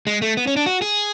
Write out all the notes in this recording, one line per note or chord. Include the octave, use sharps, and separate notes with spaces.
G#3
A3
B3
C#4
D4
F#4
G#4